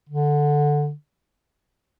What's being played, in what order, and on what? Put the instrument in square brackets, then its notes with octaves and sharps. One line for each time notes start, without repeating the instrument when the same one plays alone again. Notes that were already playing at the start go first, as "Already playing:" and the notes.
[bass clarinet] D3